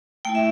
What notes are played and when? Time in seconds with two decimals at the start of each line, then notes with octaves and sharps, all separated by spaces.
0.25 A3 E4 G5
0.35 E5